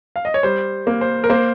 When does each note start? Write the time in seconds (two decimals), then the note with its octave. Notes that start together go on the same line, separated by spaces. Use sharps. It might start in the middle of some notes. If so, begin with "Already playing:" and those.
0.16 F5
0.25 D#5
0.34 C#5
0.43 G3 C5
0.87 A#3
1.01 C5
1.24 A#4
1.30 A#3 C5